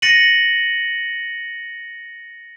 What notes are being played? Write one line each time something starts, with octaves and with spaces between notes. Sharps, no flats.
A6 A#6 C#7 D#7 F#7